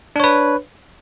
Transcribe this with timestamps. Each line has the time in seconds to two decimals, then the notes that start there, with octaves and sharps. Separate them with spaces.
0.16 D4
0.20 C#5
0.24 B4